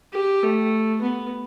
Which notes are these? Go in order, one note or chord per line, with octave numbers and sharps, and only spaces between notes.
G4
A3
B3